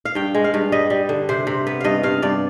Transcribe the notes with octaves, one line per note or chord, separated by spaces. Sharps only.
F5
G2 G5
G#3
F5
G2
G3 D#5
G3
D3
C3 C5
C3
B3
G2 D#5 F5
G2 F5
G2 D5